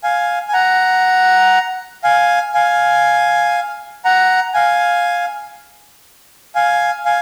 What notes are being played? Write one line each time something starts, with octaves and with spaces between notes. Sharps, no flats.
F5 G#5
G#5
F#5 A#5
F5 G#5
F5 G#5
F#5 A#5
F5 G#5
F5 G#5
F5 G#5